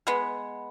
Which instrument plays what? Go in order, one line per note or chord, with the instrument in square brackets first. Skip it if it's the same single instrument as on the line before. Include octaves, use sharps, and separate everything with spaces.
[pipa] G#3 B3